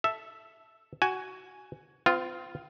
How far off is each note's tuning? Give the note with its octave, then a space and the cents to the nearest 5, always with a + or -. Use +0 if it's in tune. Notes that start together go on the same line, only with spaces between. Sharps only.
A4 +0 E5 +0
F#4 +15 G#5 +0
C4 -40 F4 +0